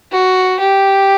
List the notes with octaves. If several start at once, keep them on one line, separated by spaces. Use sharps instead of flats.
F#4
G4